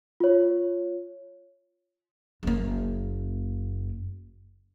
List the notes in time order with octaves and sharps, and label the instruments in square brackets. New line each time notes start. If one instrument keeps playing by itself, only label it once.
[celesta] F4 C#5
[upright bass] F#1 A#3